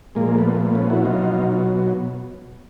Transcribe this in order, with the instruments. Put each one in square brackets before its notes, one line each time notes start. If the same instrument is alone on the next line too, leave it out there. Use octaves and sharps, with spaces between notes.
[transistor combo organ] A#2 F3 G#3 A#3
A3 B3
A3
B3 C#4
E4 F#4
B2 F#3 D#4 F4